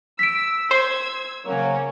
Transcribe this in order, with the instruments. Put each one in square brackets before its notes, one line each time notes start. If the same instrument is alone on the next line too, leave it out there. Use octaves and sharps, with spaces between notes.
[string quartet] E6 [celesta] B6 D7
[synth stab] C5 [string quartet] E6 G#6
[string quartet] C#3 C#4 C#5 [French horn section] F#3 A#3